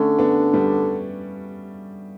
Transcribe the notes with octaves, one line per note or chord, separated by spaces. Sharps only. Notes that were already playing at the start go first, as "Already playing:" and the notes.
Already playing: D3 A3 C#4
B3 D4
G3 B3